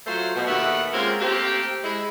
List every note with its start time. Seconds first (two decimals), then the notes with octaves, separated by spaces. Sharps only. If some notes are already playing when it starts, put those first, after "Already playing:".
0.07 F#3 A3 F4 C5
0.36 B2
0.47 D#2 A#2 A3 B3 E5 F#5
0.93 G#3 A#3 C4 C#4 F4 A#4
1.21 A3 A#3 C4 G4
1.84 G#3 E4